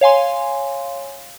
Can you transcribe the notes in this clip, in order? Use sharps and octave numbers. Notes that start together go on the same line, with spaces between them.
C#5 F5 G#5 C6